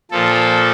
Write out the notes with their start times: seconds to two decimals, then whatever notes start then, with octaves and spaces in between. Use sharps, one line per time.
0.11 A#2 F3 A4